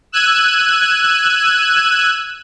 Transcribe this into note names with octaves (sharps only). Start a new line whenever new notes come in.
E6 F#6 G#6 D#7